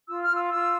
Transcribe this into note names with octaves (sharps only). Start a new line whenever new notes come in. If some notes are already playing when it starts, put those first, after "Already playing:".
F4 E6
F6
F4
E6
F4 E6